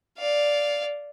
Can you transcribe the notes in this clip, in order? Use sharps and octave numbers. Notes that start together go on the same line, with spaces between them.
D5 F5